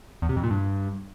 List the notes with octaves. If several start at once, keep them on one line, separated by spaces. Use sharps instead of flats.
E2
C3
F2
A#2
G2